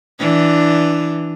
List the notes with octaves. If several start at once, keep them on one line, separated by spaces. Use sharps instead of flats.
E3 D4